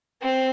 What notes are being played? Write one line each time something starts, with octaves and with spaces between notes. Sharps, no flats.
C4